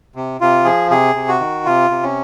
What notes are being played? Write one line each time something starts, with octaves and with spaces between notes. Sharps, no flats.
C3
C3 F4
F3 G#4
C3 G#4
C3
F#4
D#3
C3 F4
C3
C#4